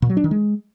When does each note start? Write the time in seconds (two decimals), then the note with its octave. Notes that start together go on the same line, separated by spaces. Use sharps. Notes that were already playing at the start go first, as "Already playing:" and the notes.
0.02 A#2
0.10 F#3
0.17 D4
0.24 D#3
0.31 G#3